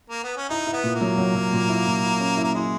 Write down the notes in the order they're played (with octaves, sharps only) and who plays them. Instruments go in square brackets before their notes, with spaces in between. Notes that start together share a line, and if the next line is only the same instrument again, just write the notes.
[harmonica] A#3
B3
C#4
[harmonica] D#4 [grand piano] E4
[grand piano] E4
[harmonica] B3
[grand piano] A#2
[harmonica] A#3
[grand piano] F#3
F#3
F#3
A#2
E4
A#2
E4
C#4
E4
[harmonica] A#3
[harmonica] G#3 [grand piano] E4